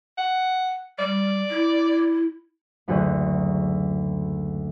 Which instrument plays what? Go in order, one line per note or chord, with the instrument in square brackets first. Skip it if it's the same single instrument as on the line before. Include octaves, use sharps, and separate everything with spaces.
[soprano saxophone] F#5
[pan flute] G3 [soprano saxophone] D5
[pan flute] E4
[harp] F#1 D2 F#4 G#4 C5 G#5